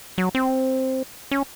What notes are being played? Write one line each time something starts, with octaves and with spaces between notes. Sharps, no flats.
F#3
C4
C#4